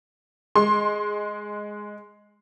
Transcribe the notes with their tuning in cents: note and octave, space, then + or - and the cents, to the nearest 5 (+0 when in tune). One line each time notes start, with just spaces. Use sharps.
G#3 +0 C6 +20